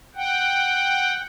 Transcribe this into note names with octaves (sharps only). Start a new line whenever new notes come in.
F#5 G5